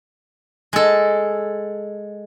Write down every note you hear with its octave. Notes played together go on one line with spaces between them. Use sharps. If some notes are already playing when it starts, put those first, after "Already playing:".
G#3 A4